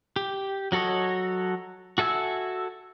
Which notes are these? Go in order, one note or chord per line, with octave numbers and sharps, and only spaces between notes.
G4
F#3 F#4 A4 C#5 D#5
F#4 A4 E5 G#5 E6